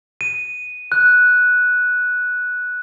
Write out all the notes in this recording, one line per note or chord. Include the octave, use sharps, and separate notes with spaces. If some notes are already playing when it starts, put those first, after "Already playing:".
D#7
F#6